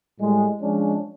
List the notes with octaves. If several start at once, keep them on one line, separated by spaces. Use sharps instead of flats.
A2 G3 G#3
F3 G#3 C#4 D4